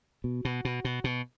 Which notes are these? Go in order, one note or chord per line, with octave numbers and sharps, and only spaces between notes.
B2
B2
B2
B2
B2